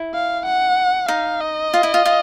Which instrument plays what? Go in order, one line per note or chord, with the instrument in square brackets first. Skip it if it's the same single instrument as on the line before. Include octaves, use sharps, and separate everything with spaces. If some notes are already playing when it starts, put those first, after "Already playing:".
Already playing: [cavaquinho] E4
[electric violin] F5
F#5
[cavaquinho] D#4 [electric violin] F5
[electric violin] D#5
[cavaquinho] F4
E4
F4
F4